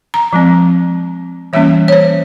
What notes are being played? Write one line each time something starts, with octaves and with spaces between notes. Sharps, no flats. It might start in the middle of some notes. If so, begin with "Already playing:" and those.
A#5
F3 G#3 C4
E3 G3 A#3 C#4 E5
C#5
C5